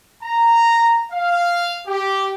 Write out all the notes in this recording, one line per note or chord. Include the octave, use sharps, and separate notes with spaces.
A#5
F5
G4